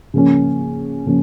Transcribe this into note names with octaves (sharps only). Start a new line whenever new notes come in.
C#3 F3 A#3 C#4
C#3 F3 A#3 C#4